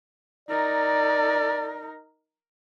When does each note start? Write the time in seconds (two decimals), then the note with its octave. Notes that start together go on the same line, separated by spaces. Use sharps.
0.49 D#4 A#4 D5